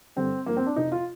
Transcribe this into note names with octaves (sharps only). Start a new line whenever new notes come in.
G2 D3 G3 C4
G2 F3 A#3
C4
D4
F2 C3 F3 D#4
F4